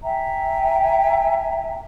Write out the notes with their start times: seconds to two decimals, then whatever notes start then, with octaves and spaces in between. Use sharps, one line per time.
0.03 E5 G5 G#5 A#5